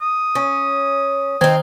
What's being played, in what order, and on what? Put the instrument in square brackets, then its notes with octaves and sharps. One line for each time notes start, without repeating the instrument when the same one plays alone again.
[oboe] D#6
[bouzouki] C#4
[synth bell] D#3 C5 G#6 [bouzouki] C4 D#4